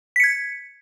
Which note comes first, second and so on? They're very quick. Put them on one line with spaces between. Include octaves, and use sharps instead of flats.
B6 C#7 G#6